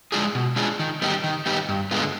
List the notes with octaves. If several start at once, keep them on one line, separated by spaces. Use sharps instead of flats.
G#3 D4 F4 G#4
B2
G#3 D4 F4 G#4
D#3
G3 B3 D#4 G4
D#3
G3 B3 D#4 G4
G2
D3 G#3 B3 F4